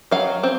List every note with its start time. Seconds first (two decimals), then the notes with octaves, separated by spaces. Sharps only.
0.11 F#3 F5
0.43 C4